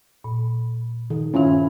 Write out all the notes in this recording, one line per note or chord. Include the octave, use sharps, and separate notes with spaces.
A#2
D#3
G2 D#3 C#4 E4 F4